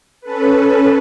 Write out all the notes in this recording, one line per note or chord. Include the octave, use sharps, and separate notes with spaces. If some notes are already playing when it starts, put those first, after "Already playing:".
C#4 A4 B4